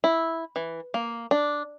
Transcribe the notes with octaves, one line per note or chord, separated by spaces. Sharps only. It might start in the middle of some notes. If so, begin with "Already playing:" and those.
E4
E3
A#3
D4